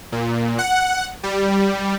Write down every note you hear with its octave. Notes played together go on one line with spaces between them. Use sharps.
A#2
F#5
G3